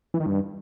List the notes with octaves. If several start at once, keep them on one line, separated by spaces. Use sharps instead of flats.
E3
D#3
G2